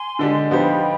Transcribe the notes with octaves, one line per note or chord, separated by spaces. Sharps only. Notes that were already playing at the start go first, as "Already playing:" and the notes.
Already playing: G#5 C6
D3 G#3 D4 G4
F3 B3 D#4 G4 C5 G5 B5